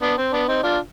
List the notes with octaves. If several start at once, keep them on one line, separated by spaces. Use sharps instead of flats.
B3 D4
C4
B3 D4
C4 D#4
D4 F4